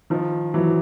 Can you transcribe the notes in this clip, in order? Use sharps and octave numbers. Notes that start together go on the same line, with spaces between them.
D#3 F3
E3 F#3